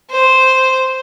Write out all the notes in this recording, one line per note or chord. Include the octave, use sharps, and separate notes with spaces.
C5